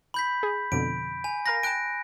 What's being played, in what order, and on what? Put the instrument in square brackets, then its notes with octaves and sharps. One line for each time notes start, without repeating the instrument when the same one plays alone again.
[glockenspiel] B5 G6 B6
[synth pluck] G#4
[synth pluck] F2 B2 D3 [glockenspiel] D7
[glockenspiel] G#5
[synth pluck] A#4 F5 A#5 [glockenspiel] A#6
[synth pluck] G5 A5 [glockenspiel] F#6 D7